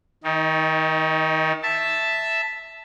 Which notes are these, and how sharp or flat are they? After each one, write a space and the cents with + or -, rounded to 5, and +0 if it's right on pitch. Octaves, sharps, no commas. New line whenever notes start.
D#3 +30 D#4 +0
E5 +0 A5 +0